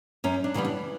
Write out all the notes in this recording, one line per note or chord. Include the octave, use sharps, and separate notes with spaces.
F#2 C#4
D4
C#3 E3 G3 B3
D4